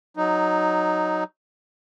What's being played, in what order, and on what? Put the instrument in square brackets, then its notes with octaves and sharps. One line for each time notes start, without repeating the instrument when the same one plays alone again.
[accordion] F#3 D#4